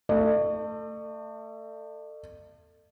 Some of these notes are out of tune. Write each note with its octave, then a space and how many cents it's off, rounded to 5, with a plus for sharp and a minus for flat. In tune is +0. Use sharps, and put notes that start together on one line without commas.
A3 +25 D5 +45